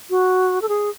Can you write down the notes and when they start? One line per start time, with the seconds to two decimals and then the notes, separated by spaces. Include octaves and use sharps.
0.10 F#4
0.62 A4
0.69 G#4